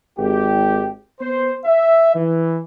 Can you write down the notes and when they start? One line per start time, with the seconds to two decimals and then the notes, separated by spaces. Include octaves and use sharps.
0.17 G#1 G4
1.20 B3 C5
1.65 E5
2.14 E3